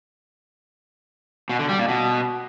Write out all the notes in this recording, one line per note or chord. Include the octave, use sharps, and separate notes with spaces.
B2
D3
G3
A#2
B2